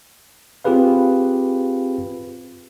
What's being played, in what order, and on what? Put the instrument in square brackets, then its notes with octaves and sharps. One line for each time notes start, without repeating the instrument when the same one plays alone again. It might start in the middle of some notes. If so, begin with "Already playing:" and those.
[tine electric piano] C4 F4 G4 G#4 B4 F5